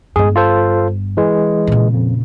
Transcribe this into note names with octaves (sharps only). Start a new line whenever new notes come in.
G1 G2 G#3 G#4
F4 A4 C5
E3 G#3
A#2 C#3
F2